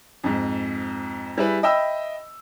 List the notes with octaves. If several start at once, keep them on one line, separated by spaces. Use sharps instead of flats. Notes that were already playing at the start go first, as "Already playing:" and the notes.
F2 G#2
G3 E4 G#4 B4
D#5 E5 G5 B5 E6